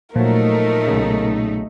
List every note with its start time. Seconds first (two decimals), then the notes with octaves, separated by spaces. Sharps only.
0.16 A#2 F3 F#3 A3 D#4 A#4
0.87 B1 C#3